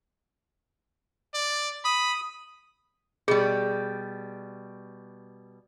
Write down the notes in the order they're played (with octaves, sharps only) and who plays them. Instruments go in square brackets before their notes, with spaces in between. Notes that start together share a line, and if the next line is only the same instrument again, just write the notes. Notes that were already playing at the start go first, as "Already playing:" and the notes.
[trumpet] D5
[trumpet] B5 [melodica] D#6
[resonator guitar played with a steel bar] B2 G3 [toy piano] G#4